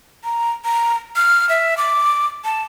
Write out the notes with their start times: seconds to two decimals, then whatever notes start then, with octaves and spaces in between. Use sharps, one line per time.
0.24 A#5
0.65 A#5
1.16 F6
1.49 E5
1.77 D6
2.44 A5